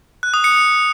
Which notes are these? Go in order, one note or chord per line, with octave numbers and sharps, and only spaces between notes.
F#6
D#6
C#7